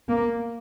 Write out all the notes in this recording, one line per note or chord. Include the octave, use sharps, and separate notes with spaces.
A#3